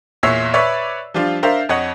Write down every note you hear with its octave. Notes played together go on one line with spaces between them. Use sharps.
E2 A#2 C#5 E5 E6 C7
B4 C#5 D5 E5 C#6
F3 G3 D4 F4 F5
D4 A#4 C5 E5 F5
F2 C#5 D#5 F#5